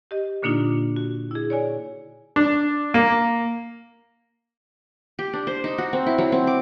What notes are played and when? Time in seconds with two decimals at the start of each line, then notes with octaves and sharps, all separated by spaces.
0.11 G4 D#5
0.42 A#2 D3 A#3 D4 D#4 F4
0.96 F#4
1.31 E4 G#4
1.50 C#5 D5 G#5
2.36 D4
2.94 A#3
5.19 G4
5.33 D4
5.47 C5
5.64 D#4
5.78 F#4
5.93 C4
6.06 E4
6.18 F#3
6.32 C4
6.47 D6